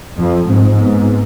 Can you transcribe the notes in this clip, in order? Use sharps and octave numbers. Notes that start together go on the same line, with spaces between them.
F2 F3
G#2 C4
B3